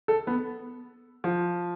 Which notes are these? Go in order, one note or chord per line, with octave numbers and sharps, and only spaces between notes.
A4
B3
F3